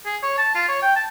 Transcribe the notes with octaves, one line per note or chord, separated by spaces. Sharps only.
G#4
C#5
A5
F4
C#5
G5
A5